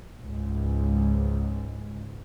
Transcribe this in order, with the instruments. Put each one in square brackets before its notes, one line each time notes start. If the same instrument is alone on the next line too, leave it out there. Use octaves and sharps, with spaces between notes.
[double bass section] C#2 G#2